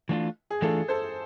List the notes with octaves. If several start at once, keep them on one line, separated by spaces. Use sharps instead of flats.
E3 A3 D4 F4
G#4
E3 A3 D4 F4 A4
A4 C5